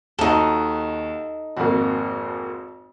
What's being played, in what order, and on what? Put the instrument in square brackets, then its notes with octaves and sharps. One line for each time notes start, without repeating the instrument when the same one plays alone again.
[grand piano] D#2 F#4 [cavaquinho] D#4 A4
[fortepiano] G#1 F2 A#3 [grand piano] F#4